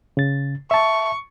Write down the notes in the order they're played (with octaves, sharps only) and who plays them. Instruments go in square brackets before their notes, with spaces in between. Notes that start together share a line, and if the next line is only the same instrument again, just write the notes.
[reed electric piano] C#3 A6
[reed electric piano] E5 A5 [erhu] C#6